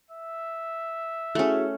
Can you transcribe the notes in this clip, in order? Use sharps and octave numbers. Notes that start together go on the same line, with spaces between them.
E5
A3 C#4 E4 F#4 G#4